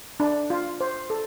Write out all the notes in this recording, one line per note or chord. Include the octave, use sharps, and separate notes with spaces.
D4
F4
C5
A4